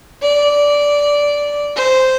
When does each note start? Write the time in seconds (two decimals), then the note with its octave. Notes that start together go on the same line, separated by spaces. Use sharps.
0.22 D5
1.76 C5